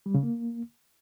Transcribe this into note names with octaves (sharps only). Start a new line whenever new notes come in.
G3
C#3
A#3